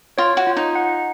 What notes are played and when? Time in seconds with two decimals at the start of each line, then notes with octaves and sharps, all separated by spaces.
0.18 F4 C#5
0.37 F#4
0.47 F4
0.57 D#4
0.75 F#5